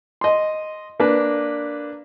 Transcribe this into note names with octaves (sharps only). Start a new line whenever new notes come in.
D#5 C6
A#3 D4 B4